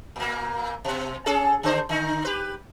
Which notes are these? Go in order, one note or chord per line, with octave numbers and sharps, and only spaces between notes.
A#2 A#3
B2
C#4 G#4 A4
D3 D4 C5
D3 D#4
G4 B4